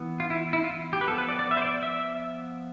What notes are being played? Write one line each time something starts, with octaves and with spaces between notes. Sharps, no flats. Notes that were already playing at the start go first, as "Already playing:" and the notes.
Already playing: E3 B3
F4
E4
E4
F4
G4
B4
F3 B3 A4
B4
D5
D5
E5
C5
D5
E5